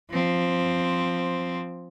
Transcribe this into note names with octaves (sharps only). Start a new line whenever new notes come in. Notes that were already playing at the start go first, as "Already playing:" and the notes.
F3 C4